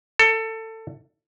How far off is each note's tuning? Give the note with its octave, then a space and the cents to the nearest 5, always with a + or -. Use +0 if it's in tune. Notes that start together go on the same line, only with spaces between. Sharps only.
A4 +20